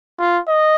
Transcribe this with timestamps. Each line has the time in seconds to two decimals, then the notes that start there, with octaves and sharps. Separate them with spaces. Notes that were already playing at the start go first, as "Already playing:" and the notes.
0.19 F4
0.48 D#5